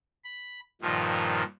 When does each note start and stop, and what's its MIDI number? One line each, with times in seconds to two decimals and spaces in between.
0.24 0.60 83
0.82 1.43 43
0.82 1.43 46
0.82 1.43 51
0.82 1.43 53